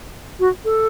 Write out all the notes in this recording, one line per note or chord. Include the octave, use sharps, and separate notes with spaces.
F#4
A4